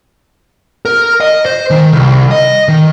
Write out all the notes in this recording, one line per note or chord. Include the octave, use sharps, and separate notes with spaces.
A#4
D#5
C5
D#3
C2
D#5
D#3